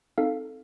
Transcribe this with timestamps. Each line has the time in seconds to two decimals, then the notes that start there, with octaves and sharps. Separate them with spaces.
0.18 C4 D#4 A4 F5